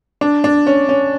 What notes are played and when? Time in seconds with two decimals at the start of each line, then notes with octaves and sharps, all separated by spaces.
0.21 D4
0.44 D4
0.67 C#4
0.89 C#4